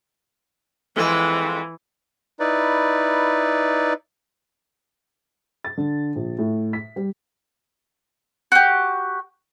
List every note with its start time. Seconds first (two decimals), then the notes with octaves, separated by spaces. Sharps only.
0.96 F2 E3 G#3 C4
2.40 D#4 E4 B4 D5
5.64 A6
5.77 D3
6.16 A#1
6.38 A2
6.73 B6
6.96 G3
8.52 F#4 G4